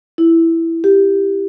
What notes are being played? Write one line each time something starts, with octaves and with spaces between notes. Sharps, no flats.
E4
G4